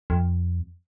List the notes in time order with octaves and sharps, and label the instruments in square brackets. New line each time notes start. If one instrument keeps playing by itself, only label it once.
[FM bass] F2